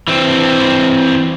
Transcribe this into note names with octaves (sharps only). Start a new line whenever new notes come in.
E3 C4